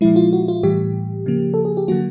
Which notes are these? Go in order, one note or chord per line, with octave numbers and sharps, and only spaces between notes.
A#2 F3 G#3 E4
F4
F#4
F4
A2 E3 G3 G4
C#3 F3 A#3
A4
G#4
G4
D3 F#3 A#3 F#4